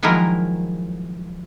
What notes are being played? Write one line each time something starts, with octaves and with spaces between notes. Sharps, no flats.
D#3 F3 F#3 G#3 E4 A#4